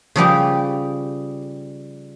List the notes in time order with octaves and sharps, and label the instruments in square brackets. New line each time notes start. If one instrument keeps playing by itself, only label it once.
[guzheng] C#3 F3 G3 G4